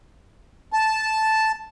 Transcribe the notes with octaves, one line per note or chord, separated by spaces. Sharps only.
A5